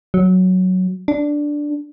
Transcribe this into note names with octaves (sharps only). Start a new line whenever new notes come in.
F#3
D4